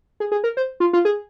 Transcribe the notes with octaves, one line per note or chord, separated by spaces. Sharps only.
G#4
G#4
A#4
C5
F4
F4
G#4